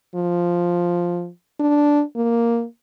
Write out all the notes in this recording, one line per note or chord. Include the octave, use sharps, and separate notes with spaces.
F3
D4
A#3